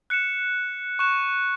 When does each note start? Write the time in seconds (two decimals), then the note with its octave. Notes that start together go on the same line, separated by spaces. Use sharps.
0.10 F#6 C#7 E7
0.99 C#6 F#6 E7